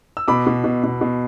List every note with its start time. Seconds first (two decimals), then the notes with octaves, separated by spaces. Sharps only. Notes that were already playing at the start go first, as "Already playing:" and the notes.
0.17 E6
0.28 B2 B5 D6
0.47 B2
0.64 B2
0.84 B2
1.01 B2